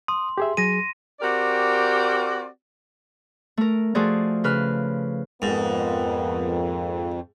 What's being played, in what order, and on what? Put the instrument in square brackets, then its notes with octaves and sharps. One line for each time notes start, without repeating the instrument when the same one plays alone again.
[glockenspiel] C6 [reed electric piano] D#6
[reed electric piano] G4 G#4 E5
[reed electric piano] F#3 G#4 [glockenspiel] A#6 D#7
[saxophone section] C4 F#4 G4 A#4 D5
[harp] A3 A#4
F3 A3 F4 F#4 G#4 D5
C#3 B4 F6
[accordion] F2 [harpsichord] G#2 [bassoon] A#3 [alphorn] B3